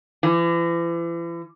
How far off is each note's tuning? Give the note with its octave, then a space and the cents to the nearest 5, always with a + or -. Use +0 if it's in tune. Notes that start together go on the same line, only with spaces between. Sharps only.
E3 +40